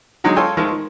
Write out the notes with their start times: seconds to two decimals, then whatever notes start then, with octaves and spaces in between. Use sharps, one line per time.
0.24 D3 F#3 G#3 D#4
0.36 F4 A4 C#5 G5 G#5 C6
0.57 D#3 F3 G#3 A3
0.71 D#3